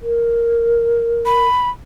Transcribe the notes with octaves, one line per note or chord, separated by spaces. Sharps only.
A#4
B5